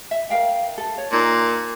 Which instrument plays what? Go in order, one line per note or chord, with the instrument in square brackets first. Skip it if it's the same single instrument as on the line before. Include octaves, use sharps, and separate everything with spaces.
[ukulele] E5
A#4 F5 G5
A4
C#5
[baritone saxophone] A#2 [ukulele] D#4